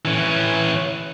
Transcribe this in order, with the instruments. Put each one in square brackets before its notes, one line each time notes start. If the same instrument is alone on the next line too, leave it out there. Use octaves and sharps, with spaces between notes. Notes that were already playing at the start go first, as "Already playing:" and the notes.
[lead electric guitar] E3 C#4